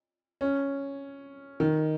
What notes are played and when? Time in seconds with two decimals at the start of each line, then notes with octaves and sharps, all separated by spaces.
0.41 C#4
1.60 D#3